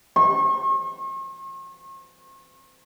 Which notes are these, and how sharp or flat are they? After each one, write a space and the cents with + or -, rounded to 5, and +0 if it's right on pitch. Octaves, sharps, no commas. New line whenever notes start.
C#6 -45